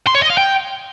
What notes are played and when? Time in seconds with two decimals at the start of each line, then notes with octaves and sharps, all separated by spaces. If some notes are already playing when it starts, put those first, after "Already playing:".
0.07 C6
0.15 C#5
0.22 D#5
0.30 F5
0.37 G5